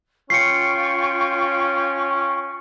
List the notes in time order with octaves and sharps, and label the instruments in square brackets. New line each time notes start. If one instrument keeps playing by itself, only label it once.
[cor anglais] C#4 [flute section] F4 G5 C#6 [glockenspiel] C7 C#7